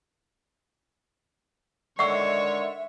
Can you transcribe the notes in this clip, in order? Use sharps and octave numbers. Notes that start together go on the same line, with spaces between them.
D3 D#3 G#3 C#5 E5 F#5 C#6 E6